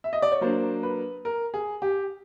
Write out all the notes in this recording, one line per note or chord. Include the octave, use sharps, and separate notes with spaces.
E5
D#5
D5
C#5
F#3 A#3 D4 C5
B4
A#4
G#4
G4